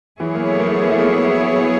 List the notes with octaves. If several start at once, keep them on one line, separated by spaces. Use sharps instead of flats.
E3 F#3 B3 E4 G#4 C#5
A#3
A3
A#3
A3
A#3
A3
A#3